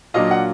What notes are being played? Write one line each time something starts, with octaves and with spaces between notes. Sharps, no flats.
A#2 F#3 A#3 D4 D#5 F5
F#5